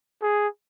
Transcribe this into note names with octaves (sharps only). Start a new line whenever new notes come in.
G#4